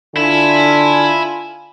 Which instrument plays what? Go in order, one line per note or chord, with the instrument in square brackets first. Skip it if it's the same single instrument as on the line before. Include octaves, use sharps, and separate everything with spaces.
[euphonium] D3 [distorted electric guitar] E4 [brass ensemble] F4 G#5